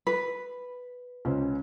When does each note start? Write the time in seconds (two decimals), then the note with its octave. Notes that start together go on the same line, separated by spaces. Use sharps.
0.07 B4
1.25 C#2 C#4 C5